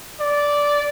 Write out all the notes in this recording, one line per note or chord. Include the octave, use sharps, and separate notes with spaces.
D5